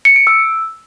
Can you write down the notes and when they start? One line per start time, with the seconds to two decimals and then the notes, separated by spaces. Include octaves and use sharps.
0.05 C#7
0.16 D7
0.27 E6